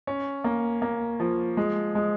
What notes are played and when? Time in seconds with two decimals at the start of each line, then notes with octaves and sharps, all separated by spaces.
0.07 C#4
0.44 A#3
0.82 A#3
1.20 F3
1.57 G#3
1.95 G#3